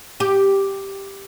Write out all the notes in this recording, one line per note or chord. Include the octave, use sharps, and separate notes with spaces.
G4